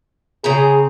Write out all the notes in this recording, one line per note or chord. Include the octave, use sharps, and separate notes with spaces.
C#3 C4 G#4 A#5